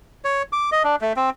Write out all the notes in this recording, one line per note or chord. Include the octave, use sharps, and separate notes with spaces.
C#5
D6
D#5
D4
A3
C4